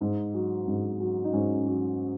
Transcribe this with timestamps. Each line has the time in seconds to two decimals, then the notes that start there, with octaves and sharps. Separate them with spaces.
0.01 G#2 D#4
0.34 F#3
0.68 G#2
1.00 F#3
1.24 D#4
1.33 G#2 C#4
1.66 F#3